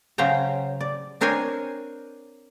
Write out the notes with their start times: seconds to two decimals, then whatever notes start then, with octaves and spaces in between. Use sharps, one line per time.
0.18 C#3 F#3 C#4 C5 G5 A#5
0.81 D5
1.21 C4 D4 A#4 C5 C#5 G#5